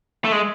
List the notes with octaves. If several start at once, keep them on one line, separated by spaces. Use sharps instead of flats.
A3
G#3